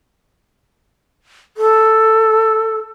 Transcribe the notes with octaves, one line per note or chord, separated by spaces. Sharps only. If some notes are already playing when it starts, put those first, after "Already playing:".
A4